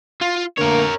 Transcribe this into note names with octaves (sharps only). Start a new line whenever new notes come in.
F4
D3 A3 A#3 A#4 C#5